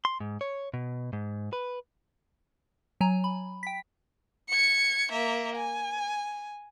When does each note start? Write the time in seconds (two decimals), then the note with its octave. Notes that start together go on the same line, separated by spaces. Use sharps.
0.05 C6
0.20 G#2
0.41 C#5
0.74 B2
1.13 G#2
1.53 B4
3.01 F#3 G#5 A#5
3.24 B5
3.63 G5 B6
4.49 G#6 C#7
5.12 A#3 E5
5.56 G#5